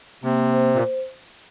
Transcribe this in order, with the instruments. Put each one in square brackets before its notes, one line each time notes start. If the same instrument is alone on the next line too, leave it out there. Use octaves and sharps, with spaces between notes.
[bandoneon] C3 [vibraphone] A#3
[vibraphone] C5
[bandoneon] A#2